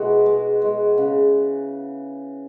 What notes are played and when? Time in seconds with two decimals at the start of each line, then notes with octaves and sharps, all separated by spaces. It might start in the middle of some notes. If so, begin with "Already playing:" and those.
Already playing: B2 G#3 E4 F#4
0.26 G#3
0.62 G#3
0.98 C#3